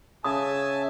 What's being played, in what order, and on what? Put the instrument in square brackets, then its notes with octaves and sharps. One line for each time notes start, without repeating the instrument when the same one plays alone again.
[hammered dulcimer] C#3 [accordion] E5 G#5 A5 [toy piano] D#6